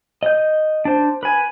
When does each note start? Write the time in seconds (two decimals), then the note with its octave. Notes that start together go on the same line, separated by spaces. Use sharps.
0.23 D#5 G6
0.85 D4 C5
1.23 B4 G#5